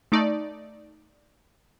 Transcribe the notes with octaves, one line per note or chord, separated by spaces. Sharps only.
A3 D#4 D5